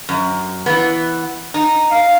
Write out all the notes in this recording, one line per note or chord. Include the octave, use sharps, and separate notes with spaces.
F#2
E3 B3
D#4
F5